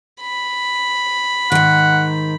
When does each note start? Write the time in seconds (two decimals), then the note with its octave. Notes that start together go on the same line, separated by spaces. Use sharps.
0.21 B5
1.52 G#2 D#3 F#5